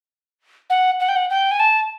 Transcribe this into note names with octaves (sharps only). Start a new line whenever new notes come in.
F#5
F#5
G5
F#5
G5
G#5
A5